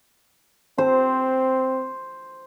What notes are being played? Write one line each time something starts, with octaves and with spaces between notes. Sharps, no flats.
C4 C5